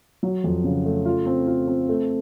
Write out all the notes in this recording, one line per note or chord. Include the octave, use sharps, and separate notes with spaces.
F#3
F2
C#3
A3
F4
C4
F4
C4
A3